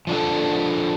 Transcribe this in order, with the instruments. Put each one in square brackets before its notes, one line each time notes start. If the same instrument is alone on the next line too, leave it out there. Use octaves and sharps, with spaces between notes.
[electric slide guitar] F3 D4 A4